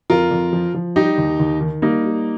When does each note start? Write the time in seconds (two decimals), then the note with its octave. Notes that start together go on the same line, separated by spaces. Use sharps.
0.10 F2 F4 A#4
0.31 F2
0.53 F3
0.74 F3
0.96 G3 D#4 G4
1.18 D#2
1.40 D#2
1.61 D#3
1.82 G3 A#3 D#4
2.04 G3